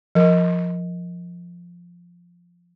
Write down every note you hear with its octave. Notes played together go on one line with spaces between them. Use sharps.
F3 A#4